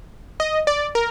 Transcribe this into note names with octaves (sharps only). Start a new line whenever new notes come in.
D#5
D5
A#4